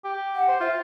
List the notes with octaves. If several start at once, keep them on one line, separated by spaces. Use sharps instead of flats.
G4
F#5
C5
F4 E5